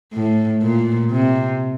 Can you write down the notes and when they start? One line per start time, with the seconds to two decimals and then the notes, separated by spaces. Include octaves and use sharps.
0.13 A2
0.63 A#2
1.12 C3